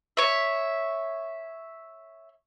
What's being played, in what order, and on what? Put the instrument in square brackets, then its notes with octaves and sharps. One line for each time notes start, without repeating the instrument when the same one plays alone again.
[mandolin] C#5 E5